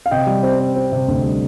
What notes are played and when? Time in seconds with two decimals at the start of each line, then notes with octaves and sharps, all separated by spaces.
0.06 F5
0.11 C3 D#5 G5
0.27 G3
0.43 C4
0.60 C4
0.76 C4
0.92 C3
1.08 D2
1.24 G3